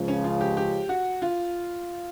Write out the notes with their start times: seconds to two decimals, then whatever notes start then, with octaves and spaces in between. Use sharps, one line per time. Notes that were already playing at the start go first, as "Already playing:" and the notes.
Already playing: C#2 C#3 F3
0.08 C#4
0.24 F4
0.41 G4
0.57 G4
0.89 F#4
1.22 F4